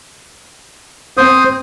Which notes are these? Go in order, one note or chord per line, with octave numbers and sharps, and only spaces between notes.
C4 C5 D#6